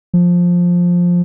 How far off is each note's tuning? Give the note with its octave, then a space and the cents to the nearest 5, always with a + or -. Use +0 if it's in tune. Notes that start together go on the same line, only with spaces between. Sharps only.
F3 +10